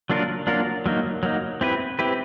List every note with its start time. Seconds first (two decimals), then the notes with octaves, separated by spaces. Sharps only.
0.10 F#3 A#3 D4 F4 A#4
0.47 F#3 A#3 D4 F4 A#4
0.86 F#3 A#3 D#4
1.23 F#3 A#3 D#4
1.61 C4 E4 G4 B4
1.99 C4 E4 G4 B4